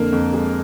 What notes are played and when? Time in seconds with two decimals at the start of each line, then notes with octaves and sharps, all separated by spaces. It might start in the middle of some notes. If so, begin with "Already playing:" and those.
Already playing: F2 D3 A#3 A#4
0.13 F2
0.33 G#3